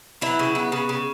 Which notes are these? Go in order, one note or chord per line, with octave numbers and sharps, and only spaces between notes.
E3 F#3 E4
C#3
B3
C#3
C#3